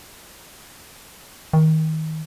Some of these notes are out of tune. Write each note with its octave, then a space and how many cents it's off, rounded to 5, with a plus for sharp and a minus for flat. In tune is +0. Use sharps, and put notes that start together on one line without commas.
D#3 +25